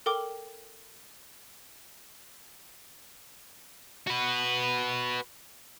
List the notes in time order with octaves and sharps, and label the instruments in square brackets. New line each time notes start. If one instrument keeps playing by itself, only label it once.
[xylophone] A4 A#4 G5 D6
[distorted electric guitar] F#4 B4